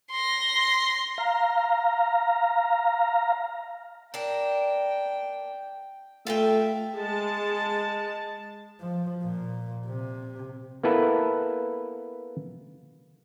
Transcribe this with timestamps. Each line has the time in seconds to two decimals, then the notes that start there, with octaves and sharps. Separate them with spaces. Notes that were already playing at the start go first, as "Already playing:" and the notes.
0.11 C6 A#6
1.18 F5 A#5
4.14 D4 A#4 G5
6.27 A3 F4 B4 E5 G5
6.97 G#3 A5
8.81 F3
9.23 A#2
9.87 C3
10.83 A#3 B3 E4 A4 B4